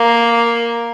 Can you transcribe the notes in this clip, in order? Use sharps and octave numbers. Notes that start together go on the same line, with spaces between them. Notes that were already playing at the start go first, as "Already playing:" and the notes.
Already playing: A#3